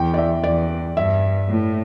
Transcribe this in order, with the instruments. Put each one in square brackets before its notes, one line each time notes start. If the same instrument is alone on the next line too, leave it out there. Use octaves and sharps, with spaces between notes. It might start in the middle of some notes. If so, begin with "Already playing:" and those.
Already playing: [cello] E2 [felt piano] G5
[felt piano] D5
E5
[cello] E2 [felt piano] D5
[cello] G2 [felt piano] E5
[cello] A2